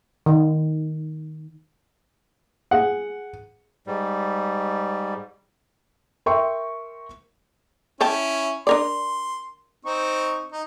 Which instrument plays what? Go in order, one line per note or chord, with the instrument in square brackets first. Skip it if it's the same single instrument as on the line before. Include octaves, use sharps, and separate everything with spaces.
[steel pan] D#3
[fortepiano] G#4 F#5
[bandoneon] G#2 G3
[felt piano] A#4 E5 G5 C6 C#6
[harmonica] C#4 E4 [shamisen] C#5 G5 A5
[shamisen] D4 A#4 D5 [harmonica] C6
[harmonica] C4 D#4 C#6
D#4